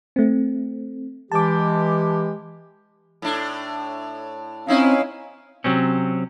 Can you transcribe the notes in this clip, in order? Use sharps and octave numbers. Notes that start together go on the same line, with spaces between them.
A3 C4
E3 G#3 G4 A5 D6
A2 D4
C4 C#4 D#4 E4 D#5 F5
C3 F#3 C4 C#4